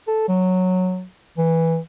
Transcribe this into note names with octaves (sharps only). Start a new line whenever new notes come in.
A4
F#3
E3